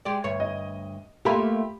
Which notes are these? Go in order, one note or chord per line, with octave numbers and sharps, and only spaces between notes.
G#3 G4 D5
D2 G2 C#5
D#5
A3 A#3 F4 G4 B5